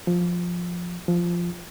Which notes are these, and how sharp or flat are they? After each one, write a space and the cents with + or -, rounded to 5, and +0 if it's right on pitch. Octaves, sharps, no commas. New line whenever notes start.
F3 +10
F3 -5